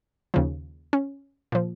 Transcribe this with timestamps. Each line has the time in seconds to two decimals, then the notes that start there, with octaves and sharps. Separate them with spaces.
0.34 D#2 C#3 F3
0.93 C#4
1.52 A#2 F3